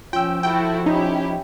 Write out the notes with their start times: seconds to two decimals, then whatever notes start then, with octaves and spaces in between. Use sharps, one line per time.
0.13 F3 C#4 F4 G5 E6
0.43 E4 F#4 A4 G5
0.86 C#4 D#4 E4 G4